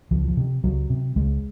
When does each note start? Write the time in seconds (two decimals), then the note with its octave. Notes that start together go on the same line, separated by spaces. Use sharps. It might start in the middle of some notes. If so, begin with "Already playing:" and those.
0.11 C#2 F3
0.28 F3
0.37 C3
0.64 C#2 F#3
0.90 C3
1.16 C#2 G#3